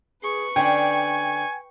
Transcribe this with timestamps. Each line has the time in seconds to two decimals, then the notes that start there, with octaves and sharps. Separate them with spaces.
0.23 G#4 B4 C#6
0.56 D3 C#4 G5 G#5